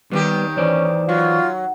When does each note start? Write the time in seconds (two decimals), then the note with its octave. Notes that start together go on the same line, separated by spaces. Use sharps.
0.11 D#2 D#3 G3 B3 G4
0.57 E3 C#4 C5 D5
1.09 F#3 F4